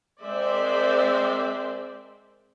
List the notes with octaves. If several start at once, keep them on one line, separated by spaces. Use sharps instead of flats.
G#3 C4 A#4 C5 D5 E5